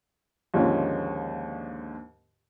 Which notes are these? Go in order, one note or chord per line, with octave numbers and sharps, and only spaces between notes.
D#2 G#2 D3 F3 C#4